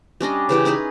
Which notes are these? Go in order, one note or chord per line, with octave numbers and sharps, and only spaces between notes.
G3 C#4 D4 D#5
C#3 E3 G4 G5
C#4 D#4 G#4 B4